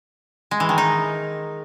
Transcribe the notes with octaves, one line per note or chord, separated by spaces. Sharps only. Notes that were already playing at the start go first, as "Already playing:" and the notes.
G#3
E3
D#3
D#4